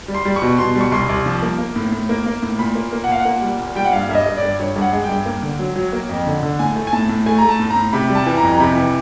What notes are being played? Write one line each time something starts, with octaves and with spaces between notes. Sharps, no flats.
G3
C6
G3
C#6
B2
B2 C6
G3
C#6
C2 C6
C2
F3
A#3
A#3
A2
A2
A#3
A#3
A2
A#2 B5
A#3
A#3
F#5
A#2 F5
F#5
A#3
G3
A#2
G3 G5
F#5
G2 F5
G2 E5
D#5
G2
D5
G2
G2 C#5
G2
F#5
G#3
G5
G2
A#3
D3
F#3
F#3
A#3
F2
D3
D3
A2 G#5
A3
G#5
A2 A5
A2
A3 G#5
A3 A#5
A5
A2
A#5
A2
C3 B5
G3
A5
E3
A#5
F2
A#5
C3 B5
E3